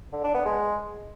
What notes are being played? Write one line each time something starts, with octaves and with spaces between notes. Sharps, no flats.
D3
D4
B3
G#3